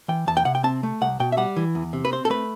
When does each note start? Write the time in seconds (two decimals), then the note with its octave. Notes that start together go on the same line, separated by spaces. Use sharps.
0.08 E3 G5
0.27 E2 A5
0.37 G5
0.45 C3 F#5
0.55 G5
0.64 C4 A5
0.83 A3
1.01 C2 F#5
1.20 B2 G5
1.32 E5
1.37 G3 F#5
1.56 E3
1.75 E2
1.93 C3
2.05 B4
2.12 C4 C5
2.25 A4
2.30 A3 B4